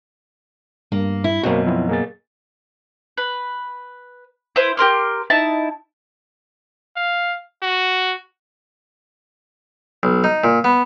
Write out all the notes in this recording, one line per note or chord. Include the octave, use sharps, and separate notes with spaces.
G2 A#3
E4
F#2 B2 A#3 C4 F#4
F3 C4 E4
A#3 G#4 A6
B4
E4 B4 C5
G4 A#4 C6 F6
D#4 E4 A5
F5
F#4
B1
D#4
A#2
B3